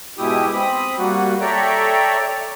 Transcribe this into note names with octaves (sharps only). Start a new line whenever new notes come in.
G#2 B2 E4 G4 D#6
C4 B5 D#6
G3 A#3 F#4
A4 C#5 D5 E5 G5 A#5